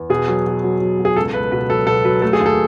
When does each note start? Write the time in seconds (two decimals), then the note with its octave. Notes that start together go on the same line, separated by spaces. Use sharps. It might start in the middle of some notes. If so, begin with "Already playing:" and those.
Already playing: E2
0.10 B2 G#4
0.28 F#3
0.46 B2
0.64 F#3
0.80 F#3
0.99 B2
1.05 G#4
1.16 C#2 A4
1.33 C#2 B4
1.52 B2 B4
1.70 F#3 A4
1.87 B2 A4
2.05 F#3 B4
2.22 A3 A4
2.33 G#4
2.40 D#2
2.46 A4